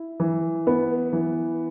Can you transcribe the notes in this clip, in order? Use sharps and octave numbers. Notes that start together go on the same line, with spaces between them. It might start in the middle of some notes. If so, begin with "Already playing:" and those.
Already playing: E4
E3
B3
E3